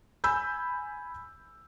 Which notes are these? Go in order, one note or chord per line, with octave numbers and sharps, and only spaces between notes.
G#5 B5 E6 G6